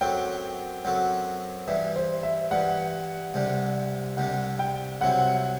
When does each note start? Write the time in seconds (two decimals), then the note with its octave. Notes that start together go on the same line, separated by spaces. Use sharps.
0.01 F#2 F#3 C4 F#4 A4 G5
0.85 F#2 F#3 C4 F#4 A4
1.67 G2 E3 G3 E5
1.96 C5
2.23 E5
2.51 G2 E3 G3 F#5
3.34 C2 C3 G3 D4
4.17 C2 C3 G3 D4 F#5
4.59 G5
5.01 C2 C3 F#3 C4 E4 F#5